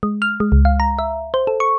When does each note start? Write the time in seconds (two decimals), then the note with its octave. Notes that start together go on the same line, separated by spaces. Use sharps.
0.03 G#3
0.22 F6
0.40 G#3
0.52 C#2
0.65 F5
0.80 A#5
0.99 E5
1.34 C5
1.47 A4
1.60 C#6